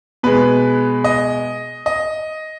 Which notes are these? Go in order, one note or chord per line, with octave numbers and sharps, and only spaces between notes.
B2 G#3 B4
D#5
D#5